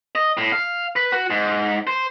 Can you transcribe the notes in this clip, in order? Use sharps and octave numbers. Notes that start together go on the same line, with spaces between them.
D#5
A2
F5
B4
F#4
G#2
C5